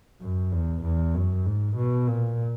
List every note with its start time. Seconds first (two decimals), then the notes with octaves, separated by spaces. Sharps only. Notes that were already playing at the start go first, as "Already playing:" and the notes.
0.22 F#2
0.53 E2
0.84 E2
1.15 F#2
1.46 G#2
1.77 B2
2.08 A#2